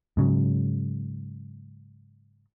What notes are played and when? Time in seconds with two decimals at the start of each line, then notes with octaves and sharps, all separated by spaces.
0.17 G#2 C#3 F#3